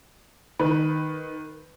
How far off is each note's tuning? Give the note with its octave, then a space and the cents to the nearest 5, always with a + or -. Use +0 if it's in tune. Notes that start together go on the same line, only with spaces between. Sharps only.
D#3 +0 B4 +5